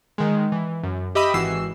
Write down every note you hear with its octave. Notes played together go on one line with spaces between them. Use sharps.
D#3 G#3
E3
F#2
G4 D#5 E5 B5 D#6
G#1 E3 F#4 E6 C7